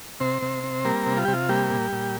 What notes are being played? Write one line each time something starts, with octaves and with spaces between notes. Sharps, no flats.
C3 C4 C5
C3
C4
G3 A#3 A#4
C3
F4
C3 G4
F4
G3 A#3 G4
A#2
A#2